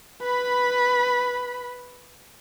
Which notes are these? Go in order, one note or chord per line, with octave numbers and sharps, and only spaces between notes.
B4 B5